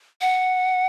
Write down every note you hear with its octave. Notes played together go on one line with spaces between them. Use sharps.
F#5